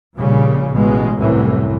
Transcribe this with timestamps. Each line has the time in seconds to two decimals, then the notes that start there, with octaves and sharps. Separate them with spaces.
0.18 A#1 A#2 C#3 G3
0.73 A1 B2 G#3
1.19 C2 F#2 A2 E3